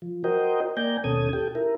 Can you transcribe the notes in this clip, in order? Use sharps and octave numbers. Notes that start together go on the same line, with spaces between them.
F3
F#4 A#4 C5 D#5 G5
A#3 D5 G5 G#5 A#5 G6
D#2 B2 C#4 A4 D#6 G#6
G4 A4 G5
E4 A#4